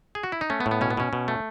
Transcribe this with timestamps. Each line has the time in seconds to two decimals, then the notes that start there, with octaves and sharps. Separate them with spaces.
0.15 G#4
0.23 F#4
0.32 E4
0.41 D#4
0.50 A3 C#4
0.60 B3
0.66 A2
0.71 B3
0.81 B2 C#4
0.90 B3
0.97 B2 C#4
1.13 B2
1.28 A3